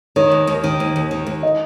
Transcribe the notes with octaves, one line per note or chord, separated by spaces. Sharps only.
D#3 C#5
D#2
D#2
D#3
D#2
D#2
D#3
D#2
D#5